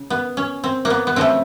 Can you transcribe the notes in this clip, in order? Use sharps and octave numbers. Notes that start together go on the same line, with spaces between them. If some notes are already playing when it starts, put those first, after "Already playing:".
Already playing: C#3
B3
C#4
C4
A#3
B3
B3
C#3 F3 A3 C4